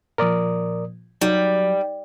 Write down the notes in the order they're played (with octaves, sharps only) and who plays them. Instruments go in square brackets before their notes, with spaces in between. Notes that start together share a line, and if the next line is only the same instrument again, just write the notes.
[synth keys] A#2 F3 [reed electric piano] A#4 D5 D#6
[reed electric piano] F#3 [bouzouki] G3 [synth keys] D#4